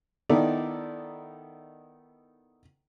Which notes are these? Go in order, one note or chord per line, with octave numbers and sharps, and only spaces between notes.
D#3 B3 D#4 E4 A4 D5